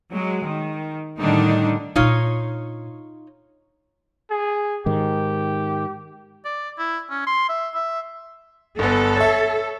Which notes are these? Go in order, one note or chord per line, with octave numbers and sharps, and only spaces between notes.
F#3 G#3
D#3
A2 D3 D#3 G3 D4 D#4
A#2 D4 D#4 F4 C#5
G#4
G#2 D#3 G4
D5
E4
C#4
C6
E5
E5
G1 B3 A4
C#5 E5